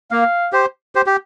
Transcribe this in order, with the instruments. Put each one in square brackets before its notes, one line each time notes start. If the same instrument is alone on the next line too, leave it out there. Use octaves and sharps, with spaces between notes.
[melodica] A#3 [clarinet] F5
[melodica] G4 C5
G4 C5
G4